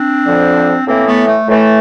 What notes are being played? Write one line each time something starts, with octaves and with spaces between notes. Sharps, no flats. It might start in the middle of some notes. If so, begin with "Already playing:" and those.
Already playing: C4 D4
F2 D3 F3
A2 E3 A#3 C4
A3 B3
A3
A2 E3 A3